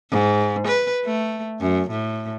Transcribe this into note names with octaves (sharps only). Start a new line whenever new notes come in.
G#2
B4
A3
F#2
A2